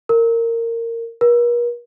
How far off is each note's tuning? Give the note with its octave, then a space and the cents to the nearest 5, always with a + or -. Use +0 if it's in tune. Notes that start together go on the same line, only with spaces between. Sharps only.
A#4 -20
A#4 +45